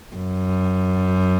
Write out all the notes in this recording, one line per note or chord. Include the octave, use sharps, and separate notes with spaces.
F#2